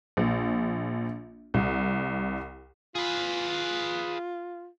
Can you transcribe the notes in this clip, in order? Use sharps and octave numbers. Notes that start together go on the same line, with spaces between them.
A#1
C2
F4 G#4 B4